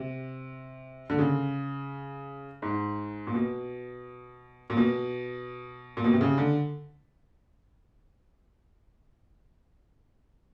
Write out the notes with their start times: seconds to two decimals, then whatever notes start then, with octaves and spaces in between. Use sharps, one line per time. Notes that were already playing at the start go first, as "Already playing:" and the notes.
Already playing: C3
1.10 D3
1.19 C#3
2.62 G#2
3.27 A#2
3.34 B2
4.70 A#2
4.77 B2
5.97 A#2
6.04 B2
6.13 C3
6.21 C#3
6.38 D3